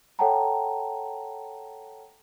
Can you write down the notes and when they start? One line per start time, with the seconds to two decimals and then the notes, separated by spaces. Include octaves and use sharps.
0.19 A4 C#5 F#5 G5 A5 A#5